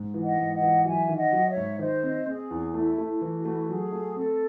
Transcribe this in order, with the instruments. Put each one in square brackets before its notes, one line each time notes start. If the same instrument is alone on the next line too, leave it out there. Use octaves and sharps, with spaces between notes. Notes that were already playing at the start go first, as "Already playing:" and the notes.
Already playing: [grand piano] G#2
E3
[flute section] D#5 F#5
[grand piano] G#2
[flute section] D#5 F#5
[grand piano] E3
[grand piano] F#3 [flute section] E5 G#5
[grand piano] D#3
[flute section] D#5 F#5
[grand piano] F#3
[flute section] C#5 E5
[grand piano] G#2
[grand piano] D#3 [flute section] C5 D#5
[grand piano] C4
[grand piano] C4 [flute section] G#4
[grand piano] E2
[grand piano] A3 [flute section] E4
[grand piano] A3
[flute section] E4
[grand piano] E3
[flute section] F#4
[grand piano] A3
[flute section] E4
F#4
[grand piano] F#3 [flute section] G#4
[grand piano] A3
[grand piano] C4 [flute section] A4